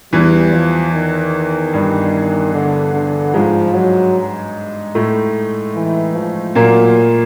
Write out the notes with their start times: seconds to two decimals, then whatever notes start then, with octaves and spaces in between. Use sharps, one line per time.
0.13 E2 E3 G3
0.53 F3
0.93 D#3
1.73 G2 G3
2.54 D3
2.94 D3
3.34 G#2 F3 G#3
3.75 F#3
4.95 A2 A3
5.76 E3
6.15 F3
6.55 A#2 F#3 A#3